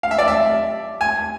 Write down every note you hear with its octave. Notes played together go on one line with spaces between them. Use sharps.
F5
E5
D5
E5
G#5